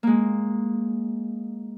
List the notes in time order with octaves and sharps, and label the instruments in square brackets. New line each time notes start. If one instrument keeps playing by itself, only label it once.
[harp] G#3 A#3